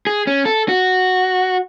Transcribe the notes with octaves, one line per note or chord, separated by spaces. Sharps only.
G#4
C#4
A4
F#4